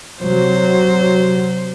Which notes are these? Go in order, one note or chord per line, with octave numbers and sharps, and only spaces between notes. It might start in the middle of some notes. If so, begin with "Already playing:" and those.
C3 F#3 C5